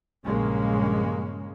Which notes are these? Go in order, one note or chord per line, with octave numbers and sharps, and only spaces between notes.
A#1 G2 C#3 G#3 A#3 C#4